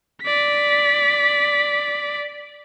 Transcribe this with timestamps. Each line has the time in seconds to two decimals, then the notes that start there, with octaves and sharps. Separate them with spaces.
0.23 D5 B6